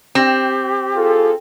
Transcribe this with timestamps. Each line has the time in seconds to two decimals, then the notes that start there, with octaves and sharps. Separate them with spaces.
0.15 C4 G4
0.96 F4 G#4 A4